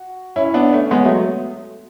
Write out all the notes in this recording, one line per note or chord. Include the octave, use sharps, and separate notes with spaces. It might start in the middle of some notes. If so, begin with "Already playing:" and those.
Already playing: F#4
C#4 E4
B3 D4
A3 C#4
G#3 B3
F#3 A3